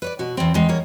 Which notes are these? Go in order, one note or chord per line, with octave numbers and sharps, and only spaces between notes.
B4 C#5 D5
B2 F#4
E2 C4
E2 G#3 C4
E2 A#3 A#4 C#5